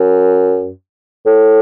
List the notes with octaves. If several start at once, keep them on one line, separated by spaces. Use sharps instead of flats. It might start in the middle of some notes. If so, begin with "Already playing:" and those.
Already playing: F#2
A2